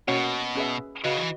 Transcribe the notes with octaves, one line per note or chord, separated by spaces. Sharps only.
B2 A#3 C#4 F#4 C#5 F#5
C#4 G#4 B4 E5
C#3 F#4 B4 D#5
E3